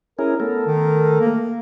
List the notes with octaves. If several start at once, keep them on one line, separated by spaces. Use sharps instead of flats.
C#4 E4 G#4 A#4
A3 B3 A4 A#4
D#3
A#3